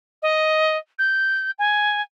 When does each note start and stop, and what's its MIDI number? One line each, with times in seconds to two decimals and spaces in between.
0.22 0.77 75
0.99 1.51 91
1.59 2.01 80